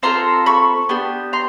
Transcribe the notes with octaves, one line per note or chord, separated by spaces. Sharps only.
C4 F4 A4 A#5 C6
B5 C#6
B3 D4 G4
A#5 C6